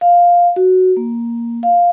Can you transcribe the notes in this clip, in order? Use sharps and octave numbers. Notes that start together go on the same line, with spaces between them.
F5
F#4
A#3
F5